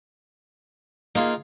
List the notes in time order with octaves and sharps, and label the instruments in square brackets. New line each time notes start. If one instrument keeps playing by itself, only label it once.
[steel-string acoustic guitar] A#3 [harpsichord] D#4 F4 G#4